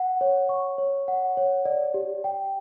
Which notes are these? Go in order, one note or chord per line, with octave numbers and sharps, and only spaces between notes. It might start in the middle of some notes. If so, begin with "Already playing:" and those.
Already playing: F#5
C#5
C#6
C#5
F#5
C#5
D5
G4
G5